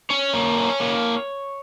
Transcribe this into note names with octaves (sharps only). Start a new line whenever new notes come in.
C#4 C#5
A#3
C#4
A#3